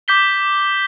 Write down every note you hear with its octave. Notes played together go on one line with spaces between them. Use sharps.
D6 G6 B6 G7